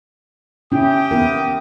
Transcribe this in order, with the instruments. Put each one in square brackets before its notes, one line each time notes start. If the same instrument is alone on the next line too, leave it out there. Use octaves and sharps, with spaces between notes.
[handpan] C#4 E4 [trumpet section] G4 G5 D#6
[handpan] B3 E4 A#4